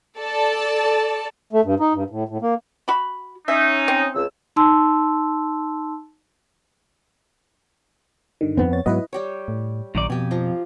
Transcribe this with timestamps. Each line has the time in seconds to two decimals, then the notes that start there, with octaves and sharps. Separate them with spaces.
0.17 A4 D5 A5
1.53 A3
1.64 G2
1.80 D#4
1.94 G2
2.10 A2
2.29 A2
2.42 A#3
2.88 F#4 B5
3.48 C#4 D#4 E5
3.88 C4
4.15 C#2 E6
4.56 D#4 A5 C6 E6
8.41 G2 D3 D#3
8.57 F2 B3 C4
8.73 C#5 A6
8.86 G#2 F#3 B3 E4 B4 D#5
9.13 G3 G4 C#5
9.48 A2
9.95 A#1 F#2 D#3 D5
10.10 F2 B2 G4 G#5
10.31 F3 F4 A#5